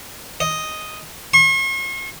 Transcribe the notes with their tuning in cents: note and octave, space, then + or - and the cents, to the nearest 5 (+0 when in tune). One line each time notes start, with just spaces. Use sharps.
D#5 +0
C#6 -45